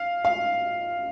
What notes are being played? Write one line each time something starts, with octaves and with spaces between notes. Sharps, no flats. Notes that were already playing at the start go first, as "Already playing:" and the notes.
Already playing: F5
F5